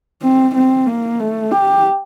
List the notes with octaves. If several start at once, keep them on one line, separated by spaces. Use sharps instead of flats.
C4
C4
A#3
A3
G4